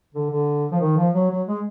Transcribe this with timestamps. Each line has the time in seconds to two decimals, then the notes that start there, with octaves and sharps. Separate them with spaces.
0.14 D3
0.30 D3
0.71 F3
0.81 D#3
0.97 F3
1.14 F#3
1.30 F#3
1.48 G#3